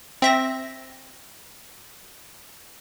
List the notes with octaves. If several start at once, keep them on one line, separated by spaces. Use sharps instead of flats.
C4 E5 A#6